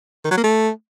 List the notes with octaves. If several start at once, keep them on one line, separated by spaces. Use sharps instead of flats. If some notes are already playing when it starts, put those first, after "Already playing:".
D#3
F#3
A#3
A3